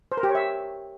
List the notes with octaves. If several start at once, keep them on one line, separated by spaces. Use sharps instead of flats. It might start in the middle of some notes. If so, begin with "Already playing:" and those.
C5
A#4
G4
C#5
E5